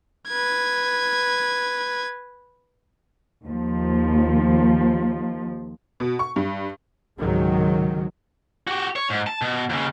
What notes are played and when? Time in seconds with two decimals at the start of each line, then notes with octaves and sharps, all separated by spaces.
0.28 B4 G#6
3.46 D#2 F3
6.00 B2
6.19 C#6
6.36 G2
7.18 C#2 G#2 C3 D#3 F#3 G#3
8.67 F#4 G4
8.96 C#5
9.10 G#2
9.27 A5
9.42 B2
9.70 D#2 C#3